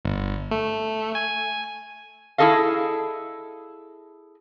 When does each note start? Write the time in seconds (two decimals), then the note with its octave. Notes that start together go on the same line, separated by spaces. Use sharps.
0.05 G1
0.51 A3
1.15 G#5
2.38 E4 F#4 G#4 A4 D#5 F5